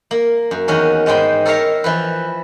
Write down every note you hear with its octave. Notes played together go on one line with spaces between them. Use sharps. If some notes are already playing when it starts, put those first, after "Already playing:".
A#3
F#2
E2 D#3 C#4 F#4
G#2 G#3 D#4 C5 G5 B5
A4 A#4 C#5 E5 F5 A#5
E3 F3 B4